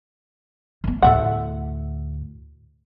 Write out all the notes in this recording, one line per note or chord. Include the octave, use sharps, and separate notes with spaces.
D#3 B3
D2 A2 A4 E5 F#5